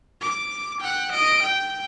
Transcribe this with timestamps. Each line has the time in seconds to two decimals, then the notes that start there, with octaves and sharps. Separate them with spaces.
0.21 D6
0.80 F#5 G5
1.11 D#5 D7
1.42 G5